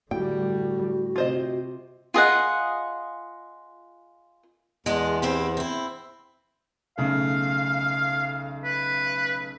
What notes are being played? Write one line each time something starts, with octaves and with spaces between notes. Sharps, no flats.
A2 D3 G3 F#4 G5
C3 F4 C5 D#5
F4 G#4 D#5 F#5
E2 G#3 D4
C4 E4 G4
C4 E4
B1 C#3 A3 F5
B4